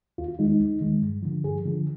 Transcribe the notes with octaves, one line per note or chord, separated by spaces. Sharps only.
D#2 F4
F4
D#3 G#3 D#4
D#4
D#2
D#3 G#3
G2
D3 F3
G2 G#4
D3 F3